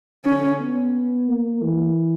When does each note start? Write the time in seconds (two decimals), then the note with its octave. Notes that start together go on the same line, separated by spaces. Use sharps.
0.25 D3 C#4
0.60 B3
1.28 A#3
1.62 E3